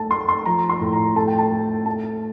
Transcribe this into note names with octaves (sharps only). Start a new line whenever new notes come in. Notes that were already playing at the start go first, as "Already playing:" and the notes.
Already playing: A3 A5
A3 C6
C6
F3 A#5
C6
A2
A#5
A3 A5
G5
A5
A3
A3 A5